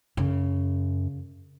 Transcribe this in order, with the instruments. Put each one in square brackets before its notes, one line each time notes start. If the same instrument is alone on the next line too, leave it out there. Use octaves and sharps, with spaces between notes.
[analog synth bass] F#2 [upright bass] C#3